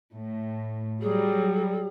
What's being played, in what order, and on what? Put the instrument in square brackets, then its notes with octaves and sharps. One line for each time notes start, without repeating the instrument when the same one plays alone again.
[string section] A2
[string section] F#3 G3 [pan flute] G#4